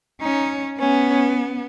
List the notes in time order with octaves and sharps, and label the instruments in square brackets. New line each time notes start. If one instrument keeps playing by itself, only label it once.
[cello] C#4 [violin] D#4
[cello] B3 [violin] C#4